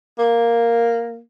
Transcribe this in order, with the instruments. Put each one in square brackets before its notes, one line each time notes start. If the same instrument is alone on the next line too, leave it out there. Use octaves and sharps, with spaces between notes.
[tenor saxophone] A#3